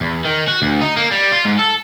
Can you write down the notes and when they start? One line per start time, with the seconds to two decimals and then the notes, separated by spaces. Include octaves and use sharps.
0.01 E2
0.25 D#3
0.48 F#4
0.62 D2
0.81 D#4
0.97 A#3
1.11 G3
1.32 F4
1.45 G#2
1.59 A4